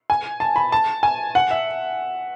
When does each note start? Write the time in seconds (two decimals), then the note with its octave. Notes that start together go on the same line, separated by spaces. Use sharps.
0.10 G#5
0.40 A5
0.56 B5
0.72 A5
1.03 G#5
1.35 F#5
1.51 E5